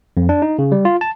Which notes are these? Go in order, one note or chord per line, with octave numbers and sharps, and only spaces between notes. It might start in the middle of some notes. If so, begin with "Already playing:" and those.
F2
D4
D#4
C#3
G3
F4
A5